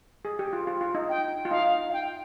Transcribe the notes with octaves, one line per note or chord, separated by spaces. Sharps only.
G#4
G4
F4
F4
F4
D#4
G5
F4
D#4 F5
F5
G5